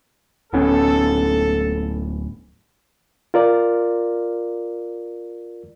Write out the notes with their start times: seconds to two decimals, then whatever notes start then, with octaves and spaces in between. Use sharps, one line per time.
0.53 D1 B3 C#4 A4
3.34 F4 A#4 D5